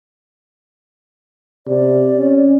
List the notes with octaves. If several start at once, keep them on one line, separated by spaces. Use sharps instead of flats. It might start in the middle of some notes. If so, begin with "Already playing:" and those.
C3 D5
C#4